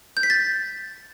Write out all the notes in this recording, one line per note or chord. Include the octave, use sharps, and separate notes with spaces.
G6
B6
A6